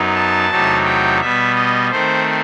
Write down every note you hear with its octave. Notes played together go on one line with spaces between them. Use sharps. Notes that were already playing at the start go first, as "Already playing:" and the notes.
Already playing: F#2 F#3 B3 D#4
A5
E2 C3 F#3 A3 D#4
G5
B2 G3 B3 E5
D#5
D#3 A3 C4 C5